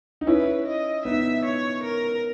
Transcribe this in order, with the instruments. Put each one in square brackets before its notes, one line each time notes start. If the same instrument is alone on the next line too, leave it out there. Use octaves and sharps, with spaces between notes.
[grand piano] D#4
[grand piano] C#4 E4 [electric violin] B4
[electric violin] D#5
[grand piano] B3 D#4 [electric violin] E5
[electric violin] C#5
A#4